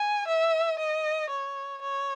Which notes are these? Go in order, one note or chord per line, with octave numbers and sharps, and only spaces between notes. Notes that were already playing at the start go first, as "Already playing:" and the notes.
Already playing: G#5
E5
D#5
C#5
C#5